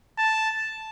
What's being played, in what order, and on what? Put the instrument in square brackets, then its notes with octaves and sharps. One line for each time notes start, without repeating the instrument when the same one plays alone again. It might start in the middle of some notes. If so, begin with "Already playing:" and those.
[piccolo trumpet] A5